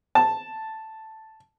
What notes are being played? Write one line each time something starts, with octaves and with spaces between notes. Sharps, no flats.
A5